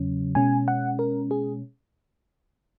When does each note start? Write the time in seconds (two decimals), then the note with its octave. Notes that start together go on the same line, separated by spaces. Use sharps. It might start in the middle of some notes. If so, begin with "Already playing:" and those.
Already playing: E2 C#3 F#3 C#4
0.35 B2 G#3 C#4 G#5
0.68 F#5
0.99 A#4
1.31 G#4